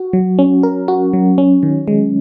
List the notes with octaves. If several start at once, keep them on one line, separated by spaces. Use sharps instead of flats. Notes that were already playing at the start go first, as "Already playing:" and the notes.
Already playing: F#4
F#3
C#4
A#4
F#4
F#3
C#4
D#3
G#3